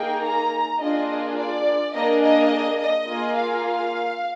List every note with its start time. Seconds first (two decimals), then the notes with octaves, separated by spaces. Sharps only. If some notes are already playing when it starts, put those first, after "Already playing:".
Already playing: A#3 D#4 G#4 G5
0.24 A#5
0.81 A#3 D4 F4 G#4 D#5
1.37 D5
1.94 A#3 D4 G#4 D#5
2.23 D#5
2.80 D#5
3.08 A#3 F4 G#4
3.37 F5